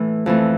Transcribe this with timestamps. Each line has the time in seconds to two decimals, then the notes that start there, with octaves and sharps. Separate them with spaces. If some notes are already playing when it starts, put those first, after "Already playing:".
Already playing: A2 E3 A3 B3
0.26 F2 E3 A3